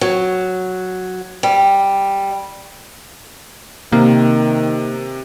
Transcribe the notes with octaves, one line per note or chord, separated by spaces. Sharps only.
F#3
G3
C3 D#3 A#3